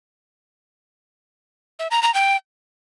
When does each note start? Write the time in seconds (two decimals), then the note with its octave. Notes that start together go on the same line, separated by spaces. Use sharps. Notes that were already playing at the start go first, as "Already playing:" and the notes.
1.79 E5
1.91 A#5
2.03 A#5
2.14 G5